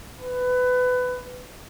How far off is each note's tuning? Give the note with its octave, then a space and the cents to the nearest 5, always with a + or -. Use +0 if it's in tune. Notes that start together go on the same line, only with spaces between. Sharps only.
B4 +20